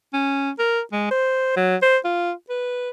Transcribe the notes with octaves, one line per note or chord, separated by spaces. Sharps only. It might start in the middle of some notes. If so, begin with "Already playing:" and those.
C#4
A#4
G#3
C5
F#3
C5
F4
B4